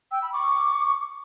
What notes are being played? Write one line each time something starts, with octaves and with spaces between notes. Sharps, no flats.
G5 E6
B5
C#6 D6